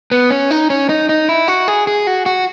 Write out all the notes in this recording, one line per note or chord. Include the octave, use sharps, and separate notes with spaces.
B3
C#4
D#4
C#4
D#4
D#4
E4
F#4
G#4
G#4
F#4
F#4